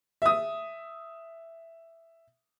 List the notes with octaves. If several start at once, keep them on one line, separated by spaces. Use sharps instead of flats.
E5 D#6